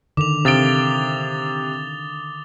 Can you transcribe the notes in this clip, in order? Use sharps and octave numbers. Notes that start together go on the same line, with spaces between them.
D3 D#3 D6 F7
C3 F5 D#6 A6 D7 G7